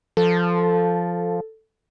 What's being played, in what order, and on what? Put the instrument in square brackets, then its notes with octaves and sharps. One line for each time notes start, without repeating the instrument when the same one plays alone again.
[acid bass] F3 [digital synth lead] A4